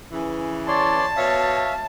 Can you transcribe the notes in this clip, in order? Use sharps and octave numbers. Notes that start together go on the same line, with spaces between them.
C#3 E3
C#5 D5 A5 C6
B2 C#5 E5 F5